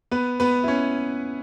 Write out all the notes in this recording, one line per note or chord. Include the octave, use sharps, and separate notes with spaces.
B3 B4
B3 B4
E4
C#4